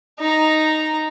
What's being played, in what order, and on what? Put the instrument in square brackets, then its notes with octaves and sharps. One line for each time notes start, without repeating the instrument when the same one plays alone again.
[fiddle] D#4 A#5